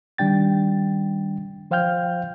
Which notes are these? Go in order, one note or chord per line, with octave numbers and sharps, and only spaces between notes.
D#3 G3 D4 G5 A6
F3 C5 F5 G5 F6 G6